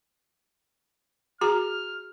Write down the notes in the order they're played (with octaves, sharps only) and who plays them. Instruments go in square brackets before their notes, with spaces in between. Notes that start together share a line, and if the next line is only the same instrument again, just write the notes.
[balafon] F#4 G#4 A#5 [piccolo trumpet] F6